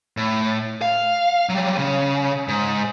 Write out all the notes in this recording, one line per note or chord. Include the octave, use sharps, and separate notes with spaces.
A2
F5
F#3 G3
C#3
G#2